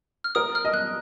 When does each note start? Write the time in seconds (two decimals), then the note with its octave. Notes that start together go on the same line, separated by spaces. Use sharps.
0.24 F6
0.35 A#4 D#6
0.55 F6
0.65 D#5
0.74 F#6